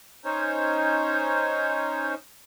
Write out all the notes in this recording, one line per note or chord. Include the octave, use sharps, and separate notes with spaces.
C#4 D#4 C5 C#5